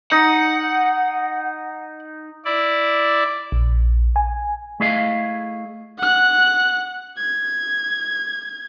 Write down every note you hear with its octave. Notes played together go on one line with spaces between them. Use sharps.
D#4 F#5
E4 D5
A#1
G#5
A3 E4 G#4 D#5 F5
F#5 F#6
G#6